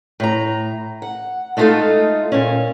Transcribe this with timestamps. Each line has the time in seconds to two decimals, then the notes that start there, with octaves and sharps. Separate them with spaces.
0.20 A2 A#5
1.02 F#5
1.57 G#3 A3 D#4 F4 A4 F5
2.32 A#2 C#4